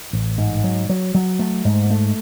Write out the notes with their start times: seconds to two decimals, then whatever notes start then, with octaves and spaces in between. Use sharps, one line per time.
0.13 A1
0.38 G#2
0.64 F#3
0.89 F#3
1.15 F#3
1.39 A3
1.65 G#2
1.90 A3